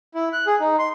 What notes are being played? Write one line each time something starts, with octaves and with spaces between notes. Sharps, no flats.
E4
F#6
G#4
D#4
C6